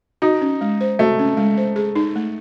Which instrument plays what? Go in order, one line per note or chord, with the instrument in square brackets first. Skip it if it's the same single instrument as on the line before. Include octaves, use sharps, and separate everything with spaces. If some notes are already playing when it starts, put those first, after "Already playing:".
[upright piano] D#4 [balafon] F#4
[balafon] C#4
G#3
C5
[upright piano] A3 [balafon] F#4
[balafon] C#4
G#3
C5
G#4
D#4
A3